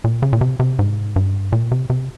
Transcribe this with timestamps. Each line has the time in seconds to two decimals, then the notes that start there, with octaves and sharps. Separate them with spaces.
0.04 A#2
0.22 C#3
0.33 A#2
0.41 C3
0.60 C3
0.79 G#2
1.16 G2
1.52 A#2
1.72 C3
1.90 C3